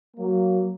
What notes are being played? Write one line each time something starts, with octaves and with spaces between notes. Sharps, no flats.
F#3 A#3